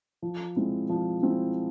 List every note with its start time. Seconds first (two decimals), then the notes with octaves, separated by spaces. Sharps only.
0.22 F3
0.56 G#3 C4 E4
0.89 F3
1.23 G#3 C4 E4